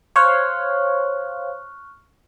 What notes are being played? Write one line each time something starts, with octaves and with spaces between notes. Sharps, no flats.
C5 C#5 F5 C#6 F6 F#6